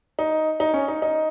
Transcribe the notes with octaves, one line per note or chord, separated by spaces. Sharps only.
D#4
D#4
C#4
D#4
D#4